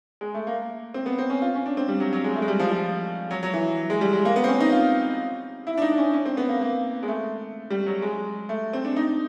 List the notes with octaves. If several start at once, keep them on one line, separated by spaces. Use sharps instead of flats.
G#3
A3
A#3
C4
B3
C4
C#4
F4
C#4
D4
C4
G3
F#3
F#3
G#3
A3
G#3
G3
F3
F3
F#3
F#3
E3
G#3
G3
G#3
A#3
B3
C4
C#4
D#4
F4
E4
D4
D#4
D4
C#4
C#4
C4
B3
A#3
A#3
G#3
A3
G3
F#3
G#3
A3
C4
D4
D#4